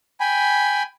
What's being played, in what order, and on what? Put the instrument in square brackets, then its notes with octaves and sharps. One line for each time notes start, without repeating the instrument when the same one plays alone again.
[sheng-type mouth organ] G5 G#5 B5